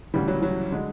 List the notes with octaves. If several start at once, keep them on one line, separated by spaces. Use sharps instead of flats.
D2 C#3 E3 G3
F#3
F#3
D3 G#3